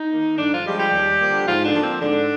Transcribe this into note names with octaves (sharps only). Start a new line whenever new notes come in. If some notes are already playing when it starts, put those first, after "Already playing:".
Already playing: D#4
D#3 A#3
G2 D3 D4
F3 F4
F3 G3 G#3 G4
G3 G4
D#2
D3 F3 A#3
G#2 F3 F4
D3 D4
F3 A#3
C4
G#2 D3 D4